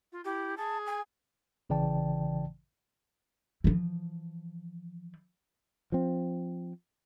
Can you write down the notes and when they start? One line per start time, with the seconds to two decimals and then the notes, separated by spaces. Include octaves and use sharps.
0.12 F4
0.25 E4 G4
0.57 G#4 A5
0.87 G#5
1.70 A1 C#3 E3 D5 G5 A5
3.64 E3 F3
5.92 F3 C4